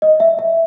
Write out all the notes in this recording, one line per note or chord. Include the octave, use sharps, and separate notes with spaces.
D#5
E5
E5